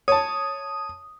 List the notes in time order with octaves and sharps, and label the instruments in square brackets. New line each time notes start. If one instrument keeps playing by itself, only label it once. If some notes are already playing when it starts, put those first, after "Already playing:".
[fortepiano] C#5 A5 [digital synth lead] D#6